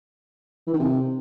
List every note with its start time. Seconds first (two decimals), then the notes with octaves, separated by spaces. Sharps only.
0.67 E3
0.73 D#3
0.80 C3